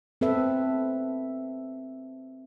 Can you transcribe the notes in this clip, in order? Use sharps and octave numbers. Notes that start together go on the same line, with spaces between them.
C4 A4 B4 E5